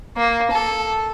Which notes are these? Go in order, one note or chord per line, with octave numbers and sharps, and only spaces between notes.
A#3
A4